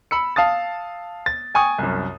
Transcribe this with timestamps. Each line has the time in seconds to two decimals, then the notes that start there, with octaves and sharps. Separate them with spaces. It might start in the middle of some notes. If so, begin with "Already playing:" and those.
0.11 B5 E6 C#7
0.36 F5 A5 D#6 A6
1.26 A6
1.55 G5 G#5 C#6 D#6
1.78 C2 F#2